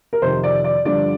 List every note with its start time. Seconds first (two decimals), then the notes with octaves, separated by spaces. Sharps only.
0.13 A#4
0.22 F2 C3 D#3 C5
0.44 D5
0.64 D5
0.85 G2 D3 F3 D5